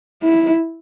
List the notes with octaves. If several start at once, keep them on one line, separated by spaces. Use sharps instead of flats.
E4